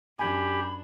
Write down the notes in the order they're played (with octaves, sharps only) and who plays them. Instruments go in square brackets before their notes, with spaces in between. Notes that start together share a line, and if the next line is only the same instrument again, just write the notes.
[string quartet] F#2 D4 [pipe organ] G4 [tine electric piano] G#5 [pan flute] B5